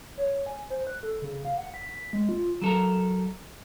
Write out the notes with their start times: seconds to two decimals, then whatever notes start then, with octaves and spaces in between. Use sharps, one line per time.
0.17 C#5
0.46 G#5
0.70 C5
0.87 F#6
1.03 A4
1.22 C#3
1.45 F5
1.58 F#5
1.74 B6
1.96 B6
2.13 G#3
2.29 F4
2.62 F#3 A4 A#4